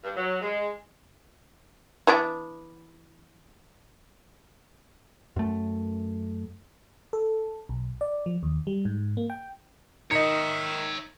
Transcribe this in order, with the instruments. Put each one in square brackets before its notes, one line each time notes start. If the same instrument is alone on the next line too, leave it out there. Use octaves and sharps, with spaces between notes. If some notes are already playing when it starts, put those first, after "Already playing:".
[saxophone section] G2
F#3
G#3
[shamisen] E3 B3 D4
[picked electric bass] F#2 A3
[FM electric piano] A4
B1
D5
F3
D#2
G3
G#2
A#3
G5
[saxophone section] D#3 [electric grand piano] D#4 D#5 [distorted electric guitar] C#5 E5 [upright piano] C#7